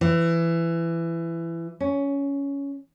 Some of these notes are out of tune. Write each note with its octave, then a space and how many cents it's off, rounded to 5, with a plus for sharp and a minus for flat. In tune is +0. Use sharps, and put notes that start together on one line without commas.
E3 +20
C#4 +15